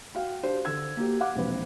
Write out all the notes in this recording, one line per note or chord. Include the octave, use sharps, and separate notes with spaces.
F#4 F5 G5
D4 G4 C5
D3 E6 G#6
A#3 F#4 G4
F5 F#5 D6
E1 A#1 C4 B4